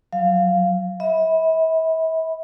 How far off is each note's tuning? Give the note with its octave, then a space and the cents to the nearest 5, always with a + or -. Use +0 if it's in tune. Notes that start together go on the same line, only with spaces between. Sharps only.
F#3 +0 F5 -10
E5 -40 B5 +0